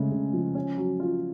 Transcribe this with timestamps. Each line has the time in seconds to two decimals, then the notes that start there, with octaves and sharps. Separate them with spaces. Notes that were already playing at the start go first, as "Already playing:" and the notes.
Already playing: C#3 G#3 A3
0.12 C#3
0.33 F3
0.55 C#4
0.77 F#3
1.00 F4